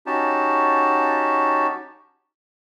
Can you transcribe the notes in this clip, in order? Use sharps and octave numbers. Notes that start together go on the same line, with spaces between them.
C#4 D#4 F#4 G4 A5